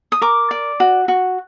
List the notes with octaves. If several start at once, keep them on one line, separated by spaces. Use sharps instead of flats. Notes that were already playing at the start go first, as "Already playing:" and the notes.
D#6
A#4 D6
D5
F#4
F#4